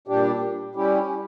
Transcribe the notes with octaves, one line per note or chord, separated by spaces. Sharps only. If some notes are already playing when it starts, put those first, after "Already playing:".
A#2 G3 D4 G4
G3 C#4 E4 G4